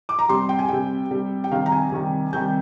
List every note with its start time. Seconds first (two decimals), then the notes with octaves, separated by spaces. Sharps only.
0.09 D6
0.19 A#5
0.29 C3 G3 C6
0.49 G5
0.59 G#5
0.68 C3 G3 G5
1.11 C3 G3
1.44 G5
1.51 C3 D#3 G3 F5
1.66 A#5
1.72 G#5
1.92 C3 D#3 G3
2.33 C3 D#3 G3 G6